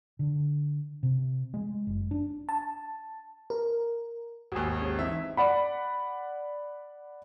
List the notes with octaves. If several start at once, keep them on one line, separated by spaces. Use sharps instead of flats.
D3
C3
G#3
F#1
D4
A5
A#4
G#1 D#2 F#4 G#5
C#4 G4 G#4
E3 C4 D#4 E5
D5 F#5 B5